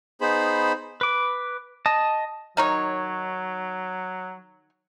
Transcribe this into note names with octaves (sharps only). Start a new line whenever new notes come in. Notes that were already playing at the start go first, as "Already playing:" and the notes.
B3 D#4 G#4 C5 B5
B4 D6
D#5 A5
D#3 F#3 D#4 C#5